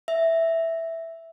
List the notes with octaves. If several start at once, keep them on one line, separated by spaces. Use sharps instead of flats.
E5